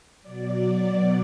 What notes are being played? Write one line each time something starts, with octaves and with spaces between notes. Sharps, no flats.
B2 F#3 D5